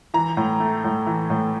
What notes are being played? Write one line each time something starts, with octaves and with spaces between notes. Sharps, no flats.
E3 A#5
A2
A3
A2
E3
A2